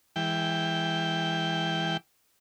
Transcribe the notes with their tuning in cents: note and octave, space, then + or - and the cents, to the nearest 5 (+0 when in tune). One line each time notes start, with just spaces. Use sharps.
E3 +0 G#3 -20 G5 +0